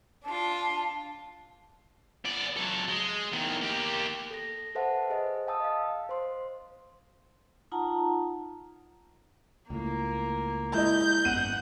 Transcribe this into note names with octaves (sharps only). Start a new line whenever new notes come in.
D4 F4 A5
B3 D5
F#3 A4
G#3
E2 D#3
A#3 G4
A4 A#6
A4 B4 C5 E5 F#5 A5
G#4 C5 D#5
F5 G5 A5 D#6 E6
D#5 F5
C5 C6
D#4 F4 F#5 A5 A#5
C#2 A2 A#3
G#3 E4 D#5 G6
G#1 F#2 B3 F#5 D#7